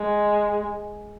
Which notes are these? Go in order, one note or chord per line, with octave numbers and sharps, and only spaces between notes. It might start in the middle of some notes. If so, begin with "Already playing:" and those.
Already playing: G#3